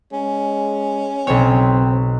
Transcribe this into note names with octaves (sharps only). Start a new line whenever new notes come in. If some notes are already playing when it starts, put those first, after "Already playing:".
G#3 C#4
B1 C4 C#5